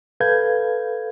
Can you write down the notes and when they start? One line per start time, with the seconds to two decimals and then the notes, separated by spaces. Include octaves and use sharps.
0.20 A4 B4 F5 G6 G#6